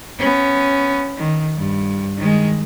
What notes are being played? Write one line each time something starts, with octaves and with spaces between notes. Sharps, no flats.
B3 C#4
D#3
G2
D#3 G#3